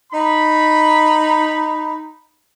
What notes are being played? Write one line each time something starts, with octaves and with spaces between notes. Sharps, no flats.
D#4 B5